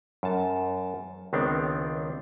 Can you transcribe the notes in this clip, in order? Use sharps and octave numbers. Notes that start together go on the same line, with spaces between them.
F#2 A5
C#2 D#3 B3 C4 D4